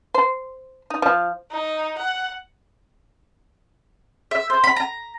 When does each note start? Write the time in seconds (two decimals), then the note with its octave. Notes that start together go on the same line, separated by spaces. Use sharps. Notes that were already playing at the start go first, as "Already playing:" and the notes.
0.14 C5
0.90 D#4
1.02 F3
1.51 D#4
1.98 F#5
4.31 E5
4.50 C5
4.64 B5
4.76 A#5